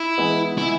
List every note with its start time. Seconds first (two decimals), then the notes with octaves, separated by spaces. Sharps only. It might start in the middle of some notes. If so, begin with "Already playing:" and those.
Already playing: E4
0.18 E3 G#3 B3
0.58 E4